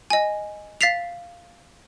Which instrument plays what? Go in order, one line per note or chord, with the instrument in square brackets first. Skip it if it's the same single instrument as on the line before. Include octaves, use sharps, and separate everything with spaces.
[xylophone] D#5 G#5
F5 A6 B6 C7 F7